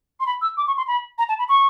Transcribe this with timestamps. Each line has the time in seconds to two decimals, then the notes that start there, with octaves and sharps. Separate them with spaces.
0.20 C6
0.26 B5
0.42 E6
0.57 D6
0.67 C#6
0.77 C6
0.88 B5
1.18 A#5
1.29 A5
1.39 B5
1.49 C#6